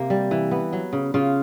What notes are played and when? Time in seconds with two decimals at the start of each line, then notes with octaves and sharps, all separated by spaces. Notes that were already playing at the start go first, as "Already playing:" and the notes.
Already playing: C3 A#3
0.10 G3
0.31 E3
0.51 B3
0.73 F#3
0.93 C#3
1.14 C#3 F4